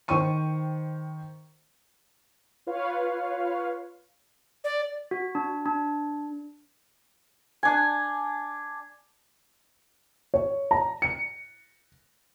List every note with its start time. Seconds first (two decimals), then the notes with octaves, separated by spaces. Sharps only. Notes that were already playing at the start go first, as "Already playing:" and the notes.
0.08 D#3 C5 G5 C#6 D#7
2.67 F4 B4 C#5 F5
4.64 D5
5.11 F#4
5.35 D4
5.66 D4
7.63 D4 G#5
10.34 C#5
10.71 A#5
11.02 C#7